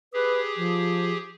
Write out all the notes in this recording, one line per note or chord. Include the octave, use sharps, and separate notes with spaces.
G4 G#4 B4
F3